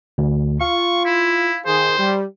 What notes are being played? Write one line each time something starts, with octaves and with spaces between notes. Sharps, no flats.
D2
F4 F5 C#6
E4
D#3 G#4 C5
G3